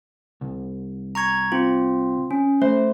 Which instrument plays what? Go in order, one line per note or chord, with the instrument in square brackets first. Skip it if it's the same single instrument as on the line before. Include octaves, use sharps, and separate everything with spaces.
[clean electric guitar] C2
[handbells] A#5 C#6 G#6
C4 F4
C#4
[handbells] A3 [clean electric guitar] C5